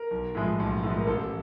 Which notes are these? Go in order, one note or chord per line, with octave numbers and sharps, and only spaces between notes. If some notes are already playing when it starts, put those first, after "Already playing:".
Already playing: A#4
B1
A2 F3 G#3
B1
A2 F3 G#3
A#4
A1 A4